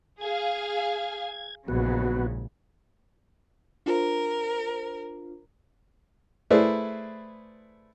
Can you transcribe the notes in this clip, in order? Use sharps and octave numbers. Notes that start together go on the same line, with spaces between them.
G#4 F5 G#6
A#1 G#2 C#3 F#3 B3 F#4
D4 F4 A#4 C5
A3 E4 G#4 B4 C5 D5